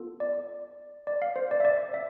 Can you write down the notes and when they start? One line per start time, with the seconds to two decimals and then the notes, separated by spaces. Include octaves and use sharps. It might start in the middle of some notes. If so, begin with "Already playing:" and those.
Already playing: B3 F4 A4
0.20 D5
1.07 D5
1.22 F5
1.36 C5
1.51 D5
1.60 E5
1.65 D5
1.94 E5